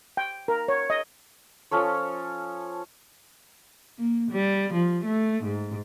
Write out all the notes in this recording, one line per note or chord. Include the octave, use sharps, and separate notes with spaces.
G5
A#4
C#5
D#5
F3 C#4 A4 C#5
A#3
G3
F3
A3
G#2